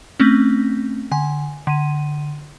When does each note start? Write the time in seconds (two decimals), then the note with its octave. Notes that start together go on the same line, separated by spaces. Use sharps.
0.20 A3 C4 C#4
1.11 D3 G#5
1.67 D3 D#7